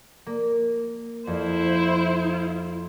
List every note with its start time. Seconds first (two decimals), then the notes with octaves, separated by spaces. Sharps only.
0.26 A#3
1.27 F2 E4 C5